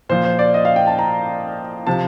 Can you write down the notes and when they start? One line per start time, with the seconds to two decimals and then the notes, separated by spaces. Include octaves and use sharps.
0.09 A#2 F3 C5
0.24 C5
0.39 D5
0.54 D#5
0.65 F5
0.76 G5
0.87 A5
0.99 A#5
1.87 C3 F3 A5